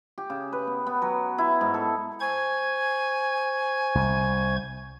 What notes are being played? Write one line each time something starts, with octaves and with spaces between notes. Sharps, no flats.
G4
C#3
B4
B3
B3
F#3
E4
G#2
A4
C5 G#5 C#6 G#6
C2